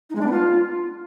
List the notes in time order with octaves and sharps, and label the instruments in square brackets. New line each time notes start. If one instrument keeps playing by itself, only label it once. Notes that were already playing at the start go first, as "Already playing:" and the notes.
[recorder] D#4
G#3
D4
B3
F4